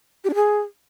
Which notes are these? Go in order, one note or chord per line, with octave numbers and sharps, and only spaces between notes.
G4
D4
G#4